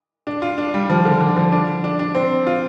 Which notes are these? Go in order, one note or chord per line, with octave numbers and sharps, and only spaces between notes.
D4
F4
D4
G3
F3
D3
D3
F3
D4
D4
D4
C4
F4